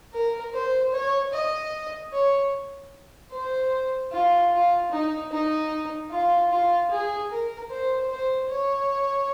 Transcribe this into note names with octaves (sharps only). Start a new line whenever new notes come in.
A#4
C5
C#5
D#5
C#5
C5
F4
F4
D#4
D#4
F4
F4
G#4
A#4
C5
C5
C#5